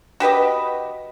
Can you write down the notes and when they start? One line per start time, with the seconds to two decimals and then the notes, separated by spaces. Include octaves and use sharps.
0.20 F#4 G4 B4 D#5